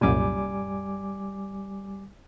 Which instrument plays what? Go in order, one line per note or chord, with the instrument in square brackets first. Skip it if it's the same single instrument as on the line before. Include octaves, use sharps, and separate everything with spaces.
[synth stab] C2 F#2 A#2 [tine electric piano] G3 G#5 D6